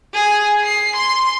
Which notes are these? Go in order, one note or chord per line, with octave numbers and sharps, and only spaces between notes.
G#4
C7
C6